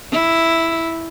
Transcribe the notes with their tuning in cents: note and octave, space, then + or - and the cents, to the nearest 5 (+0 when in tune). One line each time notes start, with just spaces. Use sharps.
E4 +0